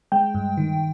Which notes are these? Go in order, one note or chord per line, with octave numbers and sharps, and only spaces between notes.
G#3 G5
G2
D#3